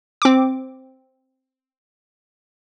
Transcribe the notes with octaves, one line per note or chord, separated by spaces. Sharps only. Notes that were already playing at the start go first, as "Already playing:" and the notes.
C4 D6